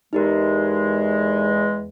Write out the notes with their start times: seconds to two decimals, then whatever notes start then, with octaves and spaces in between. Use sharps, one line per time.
0.13 E2 G#3 D#4 G4 A#4